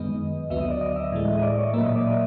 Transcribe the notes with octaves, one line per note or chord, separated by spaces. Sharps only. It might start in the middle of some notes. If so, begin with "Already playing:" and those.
Already playing: F#2 D#3 G#3 B3 D#5
D2 D3 F#3 B3 E5
D#5
D5
D#5
E5
A2 E3 G#3
D#5
D5
C#5
A#2 F#3 A#3 E5
D#5
D5
D#5